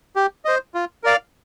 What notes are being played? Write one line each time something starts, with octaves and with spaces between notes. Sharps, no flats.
G4
C5 D#5
F4
A#4 D5 F5